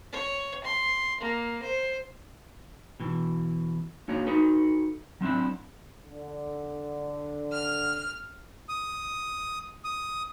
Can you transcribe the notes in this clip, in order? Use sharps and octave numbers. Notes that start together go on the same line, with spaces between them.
C#5
C6
A#3
C5
B2 E3
A#3 D4 F#4 C#5
D#4 F#4 A4 B4
F#3 C4 D4 E4
D3
F6
D#6
D#6